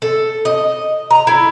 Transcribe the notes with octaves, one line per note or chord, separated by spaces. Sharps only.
A4
D#5
A#5
E4